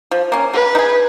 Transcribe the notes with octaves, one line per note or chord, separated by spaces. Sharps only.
F3
A#3 C#4
A#3 B4
D#4
G#4